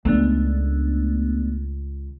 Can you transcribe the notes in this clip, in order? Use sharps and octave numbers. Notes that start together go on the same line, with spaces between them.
C#2 A3 B3 D4